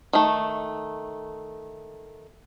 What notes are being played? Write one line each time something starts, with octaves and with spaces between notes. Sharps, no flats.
D#3 A3